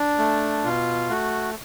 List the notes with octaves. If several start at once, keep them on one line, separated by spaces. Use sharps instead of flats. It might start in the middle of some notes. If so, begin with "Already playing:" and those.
Already playing: D4
A3
B2 F4
A3 F#4